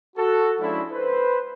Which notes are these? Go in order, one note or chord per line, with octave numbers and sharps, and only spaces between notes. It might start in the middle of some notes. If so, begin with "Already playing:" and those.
F#4 A4
F3 G#3 C#4 D4 E4
B4 C5